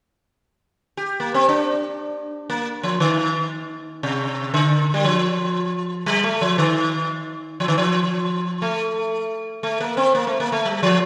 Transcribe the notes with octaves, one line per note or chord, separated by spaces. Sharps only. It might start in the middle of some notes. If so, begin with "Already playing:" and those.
G4
A#3
C4
D4
A#3
F3
D#3
C3
D3
G3
F3
G3
A3
F3
D#3
F3
D#3
F3
A3
A3
A#3
C4
A#3
A3
A#3
A3
G3
F3